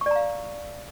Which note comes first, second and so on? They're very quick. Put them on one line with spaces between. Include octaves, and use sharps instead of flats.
C#6 D5 A#5 F5